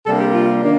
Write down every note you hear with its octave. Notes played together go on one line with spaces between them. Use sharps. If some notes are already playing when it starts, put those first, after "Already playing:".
C3 G3 A#3 D4 A4
G4
F4
D#3 A#3 D4